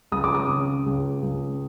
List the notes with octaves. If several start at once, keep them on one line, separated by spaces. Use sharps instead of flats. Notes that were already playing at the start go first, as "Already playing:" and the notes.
C#2 D#6
D6
D#6
C#3
C#2
C#2